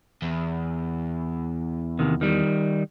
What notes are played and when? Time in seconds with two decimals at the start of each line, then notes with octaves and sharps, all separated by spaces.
0.22 E2
1.99 D#2 C3 D#3
2.21 D#3 G3